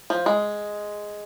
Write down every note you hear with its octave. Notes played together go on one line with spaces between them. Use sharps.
F3
G#3